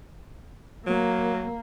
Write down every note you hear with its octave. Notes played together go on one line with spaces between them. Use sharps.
F#3 A#3